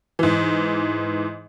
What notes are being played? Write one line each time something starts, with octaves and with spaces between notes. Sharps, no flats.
G#2 E3